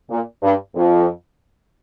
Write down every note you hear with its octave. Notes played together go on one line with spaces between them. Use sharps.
A#2
G2
F2